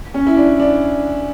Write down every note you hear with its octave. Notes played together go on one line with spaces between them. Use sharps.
C#4
E4
D4
D4